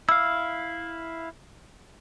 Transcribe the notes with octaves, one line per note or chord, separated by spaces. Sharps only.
E4 F5 E6